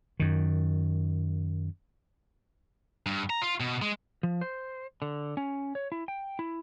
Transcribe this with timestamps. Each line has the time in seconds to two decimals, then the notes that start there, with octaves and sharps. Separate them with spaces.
0.20 F#2 D#3
3.06 G2
3.30 A#5
3.42 F4
3.60 B2
3.82 G#3
4.23 F3
4.41 C5
5.02 D3
5.37 C#4
5.75 C#5
5.92 E4
6.08 G5
6.39 E4